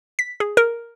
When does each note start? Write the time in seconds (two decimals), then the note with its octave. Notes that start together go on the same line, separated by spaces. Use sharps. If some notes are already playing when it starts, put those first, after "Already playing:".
0.19 B6
0.40 G#4
0.57 A#4